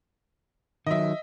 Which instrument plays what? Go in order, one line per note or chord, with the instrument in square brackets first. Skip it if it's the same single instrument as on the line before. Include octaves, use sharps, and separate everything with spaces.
[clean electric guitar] D#3 F#3 [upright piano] D#5 E5